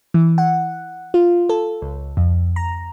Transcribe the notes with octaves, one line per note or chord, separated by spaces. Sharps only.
E3
F#5
F4
A4
C#2
F2
A#5